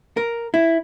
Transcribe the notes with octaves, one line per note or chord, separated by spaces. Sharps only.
A#4
E4